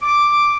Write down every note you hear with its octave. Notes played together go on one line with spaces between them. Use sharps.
D6